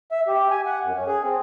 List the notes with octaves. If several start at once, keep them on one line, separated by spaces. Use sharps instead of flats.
E5
G4
G#5
F#5
F#2
C#4
G#4
C4